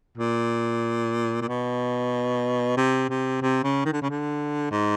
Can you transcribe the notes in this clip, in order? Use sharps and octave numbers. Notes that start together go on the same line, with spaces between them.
A#2
A#2
B2
C3
C3
C3
C#3
D#3
D3
C#3
D3
G#2